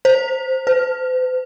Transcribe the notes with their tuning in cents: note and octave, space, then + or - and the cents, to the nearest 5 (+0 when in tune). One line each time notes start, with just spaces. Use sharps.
C5 +0
C5 -45